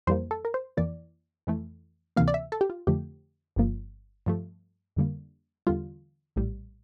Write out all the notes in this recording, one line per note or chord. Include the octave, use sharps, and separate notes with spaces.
F2 E3 G3 A#3 C5
A4
A#4
C5
F2 E3 A#3 D5
F2 E3 A3
D2 C3 E3 A#3 F5
D5
E5
A4
G4
F4
F2 D3 F3 A3 G4
G1 G2 F3 A#3
G2 F3 A3
F2 D3 G3 A#3
E2 D3 G3 F4
A#1 A2 G3